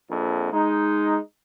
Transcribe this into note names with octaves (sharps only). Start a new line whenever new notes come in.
A#1 F2
G#3 D#4